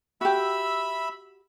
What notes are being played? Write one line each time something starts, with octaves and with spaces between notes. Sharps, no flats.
F#4 G4 E5 B5 E6